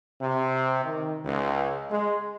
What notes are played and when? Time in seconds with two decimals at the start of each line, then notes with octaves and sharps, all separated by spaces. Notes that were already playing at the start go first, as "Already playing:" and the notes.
0.22 C3
0.84 D#3
1.25 C#2
1.91 G#3